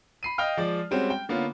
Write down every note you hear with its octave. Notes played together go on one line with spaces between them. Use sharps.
B5 C7 D#7
D#5 F5 G5 F6
F3 G#3 D5
G3 G#3 C4 C#4 F#4 G4
G5
D3 A#3 B3 C#4 F4